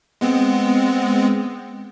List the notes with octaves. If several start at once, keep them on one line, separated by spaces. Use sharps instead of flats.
G#3 B3 C4